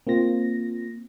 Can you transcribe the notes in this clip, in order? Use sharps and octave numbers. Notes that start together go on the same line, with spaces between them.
A#3 C4 F4 A#6